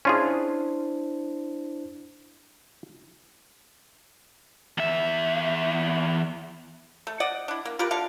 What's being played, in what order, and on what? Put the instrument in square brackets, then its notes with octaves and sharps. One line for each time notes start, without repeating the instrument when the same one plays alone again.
[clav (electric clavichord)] C#4 F4 G#4 [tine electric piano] D4 E4 C5
[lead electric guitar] E2 E5
[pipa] A3
D5 D#5 F#5
D4 E4
A#3
F4 G4 A#4 B4
D3 A4 F5